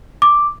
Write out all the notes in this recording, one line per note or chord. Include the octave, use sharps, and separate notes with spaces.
D6